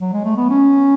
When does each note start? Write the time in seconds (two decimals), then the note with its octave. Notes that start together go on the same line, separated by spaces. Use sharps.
0.01 F#3
0.13 G#3
0.25 A3
0.37 B3
0.50 C#4